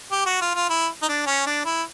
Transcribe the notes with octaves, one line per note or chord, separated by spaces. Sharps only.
G4
F#4
F4
F4
E4
D#4
D4
C#4
D4
E4